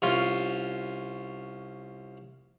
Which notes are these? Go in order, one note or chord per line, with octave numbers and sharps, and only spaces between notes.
C2 C#4 F4 C6